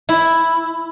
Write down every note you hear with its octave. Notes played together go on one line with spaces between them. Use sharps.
E4